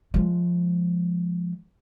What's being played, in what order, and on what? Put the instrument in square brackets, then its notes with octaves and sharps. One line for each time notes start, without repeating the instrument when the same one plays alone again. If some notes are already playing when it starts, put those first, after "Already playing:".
[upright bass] F3 G#3